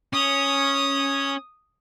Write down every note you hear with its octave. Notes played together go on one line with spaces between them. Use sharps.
C#4 D#6